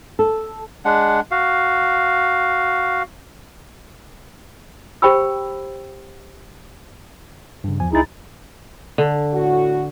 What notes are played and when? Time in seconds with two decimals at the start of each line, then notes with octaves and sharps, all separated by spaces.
0.19 A4
0.85 G#3 D4 F#5
1.31 F#4 F5
5.02 G4 C5 G5 B5 E6
7.64 G2 C#3
7.80 E2 F3 G#5
7.93 C#2 D#4 E4 G#4 A6
8.98 D3
9.33 A2 F#4